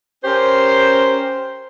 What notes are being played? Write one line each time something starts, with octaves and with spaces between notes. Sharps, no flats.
C#4 G4 A#4 C5